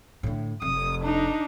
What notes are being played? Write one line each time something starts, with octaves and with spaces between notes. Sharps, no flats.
A2 D3
F1 D#6
D4 D#4